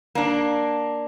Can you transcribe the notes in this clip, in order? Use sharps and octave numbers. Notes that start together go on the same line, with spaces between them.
A#3 D4